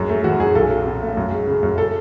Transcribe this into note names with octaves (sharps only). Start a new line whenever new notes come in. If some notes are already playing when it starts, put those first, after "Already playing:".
Already playing: F#2 G#3
A3
E3 F#4
F#2 G#4
B1 A4
F#3
B2
A3
F#2
G#3
C#3
F#2
A4